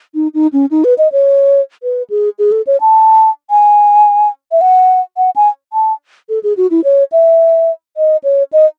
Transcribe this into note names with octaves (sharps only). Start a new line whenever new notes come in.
D#4
D#4
C#4
D#4
B4
D#5
C#5
B4
G#4
G#4
A4
C#5
A5
G#5
E5
F#5
F#5
G#5
A5
A4
G#4
F#4
E4
C#5
E5
D#5
C#5
D#5